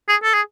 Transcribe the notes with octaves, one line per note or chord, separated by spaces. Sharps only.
G#4
A4
G#4